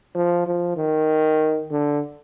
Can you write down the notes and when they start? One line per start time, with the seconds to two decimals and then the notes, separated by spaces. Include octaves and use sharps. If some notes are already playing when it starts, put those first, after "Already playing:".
0.15 F3
0.46 F3
0.77 D#3
1.71 D3